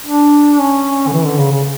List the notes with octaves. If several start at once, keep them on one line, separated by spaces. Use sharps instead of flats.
D4
C#4
D3
E3
D3
C#3
C#3